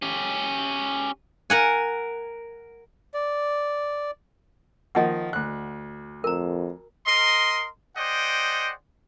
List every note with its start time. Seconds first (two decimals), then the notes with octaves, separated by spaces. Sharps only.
0.02 C#4 G4
1.50 A#4 F#5 G#5
3.14 D5
4.95 D#3 F3 A#3 D#5 F#5
5.33 D2 F#6
6.24 F2 A#4 A#5
7.07 A#4 D#5 C6
7.96 G#4 C5 D5 D#5 F#5 G5